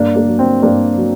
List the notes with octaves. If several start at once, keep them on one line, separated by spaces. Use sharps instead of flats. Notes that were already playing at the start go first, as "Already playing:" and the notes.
Already playing: G2 A#3 D4
A#3
F#3
C4
G2 A#3 D4
F#3